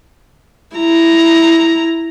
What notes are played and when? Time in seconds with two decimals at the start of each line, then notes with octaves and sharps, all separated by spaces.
0.76 E4 A#5